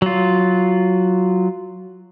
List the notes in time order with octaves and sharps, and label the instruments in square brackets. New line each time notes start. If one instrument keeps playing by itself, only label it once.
[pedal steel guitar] F#3 F4